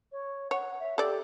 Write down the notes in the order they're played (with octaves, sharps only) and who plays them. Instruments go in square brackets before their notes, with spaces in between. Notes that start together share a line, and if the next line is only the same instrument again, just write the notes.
[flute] C#5
[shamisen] C#5 [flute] F#5
[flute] E5
[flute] G4 [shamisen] A4 D5